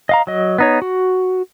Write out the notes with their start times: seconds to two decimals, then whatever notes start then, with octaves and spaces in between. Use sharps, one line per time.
0.09 D#5 F5 A#5
0.27 F#3 D#5
0.58 B3 D#4 C#5
0.82 F#4